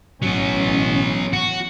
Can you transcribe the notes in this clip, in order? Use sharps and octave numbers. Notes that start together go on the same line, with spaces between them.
A1 F#3 B3 C#4
F#4